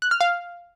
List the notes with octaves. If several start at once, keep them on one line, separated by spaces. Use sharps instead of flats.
F#6
F6
F5